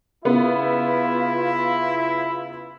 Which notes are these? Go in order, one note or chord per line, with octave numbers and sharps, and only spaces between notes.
C#3 B3 E4 F4